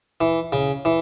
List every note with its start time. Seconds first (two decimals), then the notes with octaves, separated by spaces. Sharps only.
0.21 E3
0.53 C#3
0.85 E3